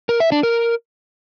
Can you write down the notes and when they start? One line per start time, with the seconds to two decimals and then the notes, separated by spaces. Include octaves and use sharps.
0.09 A#4
0.20 E5
0.32 D4
0.43 A#4